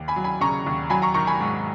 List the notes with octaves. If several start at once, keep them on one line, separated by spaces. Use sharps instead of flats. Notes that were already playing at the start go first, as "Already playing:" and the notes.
Already playing: D#2
G#5 B5
F#3
G#5 B5
C#3 A#5 C#6
D#2
F#3 G#5 B5
A#5 C#6
D#3 A#5 C#6
G#5 B5
G#2